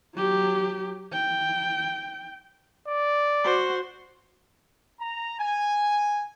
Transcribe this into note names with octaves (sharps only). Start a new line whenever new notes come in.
F#3 G4
G5
D5
F#4 C5
A#5
G#5